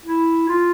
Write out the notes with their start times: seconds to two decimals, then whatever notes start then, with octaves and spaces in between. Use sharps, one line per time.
0.06 E4
0.49 F4